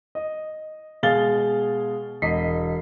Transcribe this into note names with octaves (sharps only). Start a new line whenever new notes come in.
D#5
B2 G#3 F5 G#5 A6 G7
E1 D#5 B6 C7